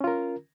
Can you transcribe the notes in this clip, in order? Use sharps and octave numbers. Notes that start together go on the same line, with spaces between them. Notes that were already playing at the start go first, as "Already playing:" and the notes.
C#4 F4 A#4